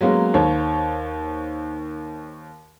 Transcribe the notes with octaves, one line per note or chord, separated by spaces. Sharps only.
F#3 G#3 A#3 B3 C#4
D#2 C5 C#5